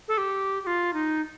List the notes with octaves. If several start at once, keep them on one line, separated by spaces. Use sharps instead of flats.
A4
G4
G4
F4
D#4